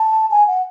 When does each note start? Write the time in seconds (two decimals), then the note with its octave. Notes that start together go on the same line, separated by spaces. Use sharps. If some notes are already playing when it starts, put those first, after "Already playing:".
Already playing: A5
0.31 G#5
0.47 F#5